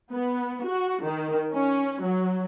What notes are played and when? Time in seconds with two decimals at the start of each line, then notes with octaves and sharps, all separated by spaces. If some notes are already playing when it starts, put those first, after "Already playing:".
0.12 B3
0.66 F#4
1.03 D#3
1.53 C#4
2.02 F#3